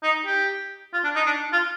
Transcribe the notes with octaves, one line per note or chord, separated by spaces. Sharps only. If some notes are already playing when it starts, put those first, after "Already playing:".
D#4
G4
F4
D4
D#4
D4
F4